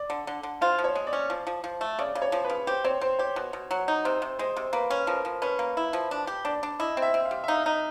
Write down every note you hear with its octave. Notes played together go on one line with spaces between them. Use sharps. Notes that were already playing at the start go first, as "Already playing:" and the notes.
Already playing: D5
D3
D3
D3
F4 C5
F3
C#5
G#3
D5
C#4
F3
F3
F3
A3
C#3 D5
C#3
C#5
F3
C#3 B4
G4 C5
C4 C#5
C4 C5
G4 C#5
B2
B2
F#3
D#4
C3 C5
C3
G#3 C5
C3
A#3 B4
C#4
F3 A#4
F3
C#4 B4
A#3
E4
F3
D4
G4
D4 D5
D4
E4 D#5
C4
E5
C4
F5
G3
E5
D#4 F5
D#4